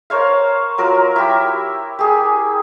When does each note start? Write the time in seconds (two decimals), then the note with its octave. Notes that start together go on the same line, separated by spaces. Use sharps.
0.10 A#4 C5 C#5 F5
0.78 F#3 F4 A#4
1.16 E4 G4
1.99 G4 G#4